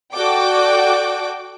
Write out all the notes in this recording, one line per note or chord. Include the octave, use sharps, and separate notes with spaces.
F#4 A4 D5 G5 D6